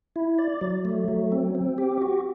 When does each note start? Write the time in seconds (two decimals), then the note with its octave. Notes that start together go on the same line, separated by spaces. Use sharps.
0.16 E4
0.39 D5
0.61 F#3
0.85 A3
1.08 F#3
1.32 C4
1.55 C4
1.78 G4
2.02 F#4